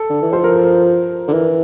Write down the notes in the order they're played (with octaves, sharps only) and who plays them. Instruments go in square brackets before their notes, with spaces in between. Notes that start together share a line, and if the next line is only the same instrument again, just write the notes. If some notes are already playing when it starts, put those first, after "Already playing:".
Already playing: [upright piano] A4
[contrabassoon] D3
E3
[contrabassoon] F3 [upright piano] C5
[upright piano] A#4
A4
A#4
[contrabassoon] D3
[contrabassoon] E3 [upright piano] A#4